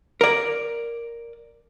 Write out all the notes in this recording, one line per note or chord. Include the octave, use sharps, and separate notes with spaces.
A#4 D5